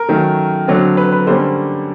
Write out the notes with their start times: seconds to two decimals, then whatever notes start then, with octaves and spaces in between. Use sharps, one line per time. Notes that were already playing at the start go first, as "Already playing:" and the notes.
Already playing: A#4
0.09 D#3 F#3 A3 C#4
0.68 D3 F#3 A3 C4
0.97 B4
1.12 B4
1.27 D3 G3 A#3 C#4 C5